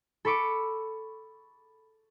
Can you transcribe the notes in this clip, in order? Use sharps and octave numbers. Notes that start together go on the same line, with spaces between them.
A4 B5 C#6 D6